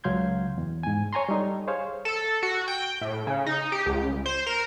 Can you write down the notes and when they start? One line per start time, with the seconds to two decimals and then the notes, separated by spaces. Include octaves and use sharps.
0.04 C#2 F#3 F5 C6 G6 G#6
0.58 E2
0.83 G#2 G#5
1.13 C#5 G#5 A#5 C6
1.29 G3 D#4 A4
1.67 G#4 C5 C#5 F5
2.05 A4
2.43 F#4
2.68 G5
3.01 A2
3.27 C#3
3.46 D#4
3.72 G4
3.86 C#2
4.26 C5
4.47 A#4